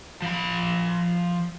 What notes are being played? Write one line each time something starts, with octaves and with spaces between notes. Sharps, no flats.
F3 B5